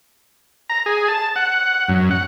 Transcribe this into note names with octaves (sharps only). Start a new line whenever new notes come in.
A#5
G#4
A5
F#5
F#2
F#5